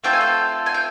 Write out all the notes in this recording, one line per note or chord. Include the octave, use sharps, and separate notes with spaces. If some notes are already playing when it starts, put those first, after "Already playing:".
A3 C4 F4 A4 G5
G#5
G5
G#5
G5